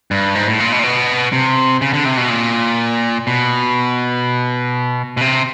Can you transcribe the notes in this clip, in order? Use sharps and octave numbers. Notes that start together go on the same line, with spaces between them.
G2
G#2
A2
A#2
B2
A#2
B2
C3
C#3
D3
C3
B2
A#2
B2
B2
C3